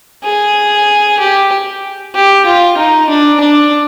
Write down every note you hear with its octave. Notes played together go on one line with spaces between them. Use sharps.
G#4
G4
G4
F4
D#4
D4
D4